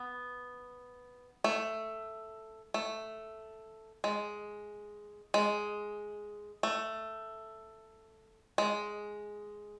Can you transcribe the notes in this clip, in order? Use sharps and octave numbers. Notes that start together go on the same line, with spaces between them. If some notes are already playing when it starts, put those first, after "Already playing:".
Already playing: B3
A3
A3
G#3
G#3
A3
G#3